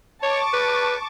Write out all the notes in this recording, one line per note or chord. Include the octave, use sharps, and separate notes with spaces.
C#5 A5 C#6 D6
B4